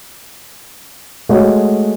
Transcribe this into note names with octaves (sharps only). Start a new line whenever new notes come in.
G#3 A3 F#4 A4 C#5